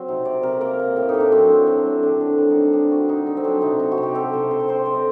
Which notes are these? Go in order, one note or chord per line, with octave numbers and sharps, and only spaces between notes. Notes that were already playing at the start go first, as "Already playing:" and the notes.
Already playing: F#3 C4 F#4
C3 D#4
C3 D5
C3 A#4
A#3 A#4
A#3
A2 G4
A2 D#4
D4
F#3 C4
A2
F#3 C4
A2
D3 D4
D3
G3 D4
D#4
D3
D4
G3 D4
C4 F#4
G3 D#4
D3
C4
F#3 D4
C3 D#4
C4 D#4
F#4
C3
G4
C4 A4
C3 C5
C3 C5
D5
C4 C5
D3 D5
D#5